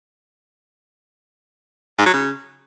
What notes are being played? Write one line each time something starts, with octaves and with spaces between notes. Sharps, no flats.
G#2
F#3
C#3